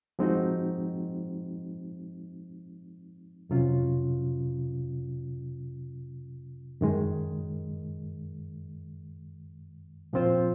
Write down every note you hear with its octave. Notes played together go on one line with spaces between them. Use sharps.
F3 G#3 C4 D#4 F#4
F2 C3 F#3 C#4 F4
F#2 D#3 G#3
A#2 F3 C4 F4 C5